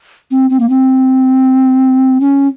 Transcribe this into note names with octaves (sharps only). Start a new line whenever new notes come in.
C4
C4
A#3
C4
C#4